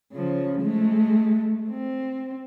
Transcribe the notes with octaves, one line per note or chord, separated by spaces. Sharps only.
C#3 F3
G#3 A3
C4